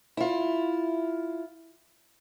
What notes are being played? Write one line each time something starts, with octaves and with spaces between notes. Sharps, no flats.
E4 F4